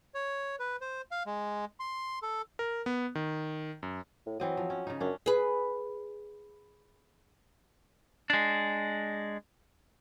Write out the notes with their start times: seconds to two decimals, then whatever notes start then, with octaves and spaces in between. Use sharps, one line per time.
0.14 C#5
0.59 B4
0.81 C5
1.11 F5
1.26 G#3
1.80 C6
2.22 A4
2.59 A#4
2.86 B3
3.15 D#3
3.83 F#2
4.26 A2
4.40 E3 F#3 C4 D#5
4.57 F3
4.70 C#4
4.87 C#3 D#4
5.00 F#2 C#4 D4
5.26 G#4 B4
8.30 G#3 D4